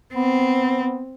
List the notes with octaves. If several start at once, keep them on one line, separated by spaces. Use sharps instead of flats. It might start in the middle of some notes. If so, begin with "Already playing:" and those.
B3 C4